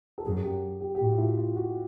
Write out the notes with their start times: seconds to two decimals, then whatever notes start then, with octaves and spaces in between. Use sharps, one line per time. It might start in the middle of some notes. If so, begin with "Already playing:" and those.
0.18 A4
0.26 F#2 G#4
0.43 G4
0.80 G4
0.95 G4
1.00 A2 F#4
1.11 F4
1.18 E4
1.37 F4
1.55 F#4